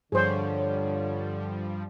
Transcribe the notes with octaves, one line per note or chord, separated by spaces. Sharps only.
G2 D3 F3 G3 G#4 C5 C#5